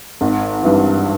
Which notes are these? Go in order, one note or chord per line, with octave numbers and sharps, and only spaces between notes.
G#1
G2 E3